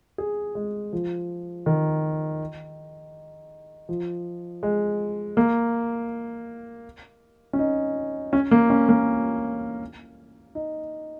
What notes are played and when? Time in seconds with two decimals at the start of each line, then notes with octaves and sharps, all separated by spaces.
0.18 G#4
0.55 G#3
0.93 F3
1.66 D#3
3.89 F3
4.63 G#3
5.37 A#3
7.53 C#4
7.59 D#4
8.33 C#4
8.51 A#3
8.70 C#4
8.89 A#3
10.55 D#4